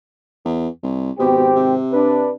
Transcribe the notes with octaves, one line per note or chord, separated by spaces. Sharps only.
E2
C2
G#1 B2 C4 G4
C3
D4 B4